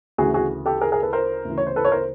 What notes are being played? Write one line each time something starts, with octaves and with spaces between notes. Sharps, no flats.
D2 C#3 E3 F#4 G#4
F#4 G#4
G4 A4
G#4 A#4
G#4 A#4
A4 B4
A#4 C5
D2 C#3 E3
C#5
C5
A4 B4
C#5
A#4 C5